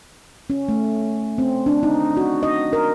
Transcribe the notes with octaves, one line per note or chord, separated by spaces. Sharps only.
C#4
A3
C4
D4
D#4
F#4
D#5
A#4